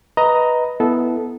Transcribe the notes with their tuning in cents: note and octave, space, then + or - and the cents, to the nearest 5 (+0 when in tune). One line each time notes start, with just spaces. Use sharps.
B4 -5 D#5 +10 A#5 +0
B3 +0 E4 +0 A4 -15